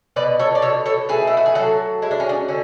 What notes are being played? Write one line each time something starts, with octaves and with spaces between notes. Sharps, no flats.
B2 B4 D5
A4 C#5
D5
B2 A4 C#5
A4 C#5
A3 G#4 B4
E4
F#4
G#4
F#3 F#4 A4
G#3 E4
D4
C#4
B3 D4
D3 C#4